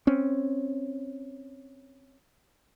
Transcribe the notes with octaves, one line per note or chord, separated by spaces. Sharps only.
C4 C#4